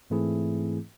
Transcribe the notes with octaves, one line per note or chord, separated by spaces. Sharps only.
G#2 E3 A3 C4 E4 G#4